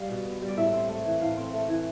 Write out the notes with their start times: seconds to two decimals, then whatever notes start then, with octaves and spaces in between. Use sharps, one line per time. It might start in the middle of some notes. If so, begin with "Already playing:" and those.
Already playing: G3 F5
0.09 B2
0.25 B3
0.42 G3
0.48 D5
0.57 A2 E5
0.73 C4
0.89 A3
1.05 E3
1.21 A2 F5
1.37 C4
1.53 A3
1.68 E3